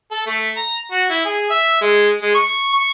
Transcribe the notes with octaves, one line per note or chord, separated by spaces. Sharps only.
A4
A3
A#5
F#4
E4
G#4
E5
G#3
G#3
C#6
C#6